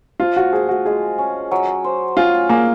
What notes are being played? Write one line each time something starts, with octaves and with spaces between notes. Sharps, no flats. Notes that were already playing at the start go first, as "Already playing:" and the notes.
F3 F4
F#4
F3 G#4
F#4
G#3 G#4
C#4
F#3
C5
C#4 F4
A#3 G#4